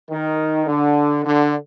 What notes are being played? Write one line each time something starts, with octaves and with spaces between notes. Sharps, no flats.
D#3
D3
D3